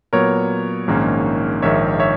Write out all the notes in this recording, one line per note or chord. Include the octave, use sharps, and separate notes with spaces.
A#2 F#3 B3 A#4 C#5
A#1 G#2 D#3 A#3 C#4
A#1 G#2 D#3 A#3 C#5 E5
C#5 E5